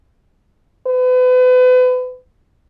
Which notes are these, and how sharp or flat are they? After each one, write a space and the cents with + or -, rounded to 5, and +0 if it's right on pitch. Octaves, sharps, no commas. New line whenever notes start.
B4 +35